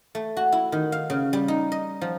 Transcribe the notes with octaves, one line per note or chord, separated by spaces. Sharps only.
A3
F#4
E4
D#3
F5
C#3
G3
D#4
D#5
F3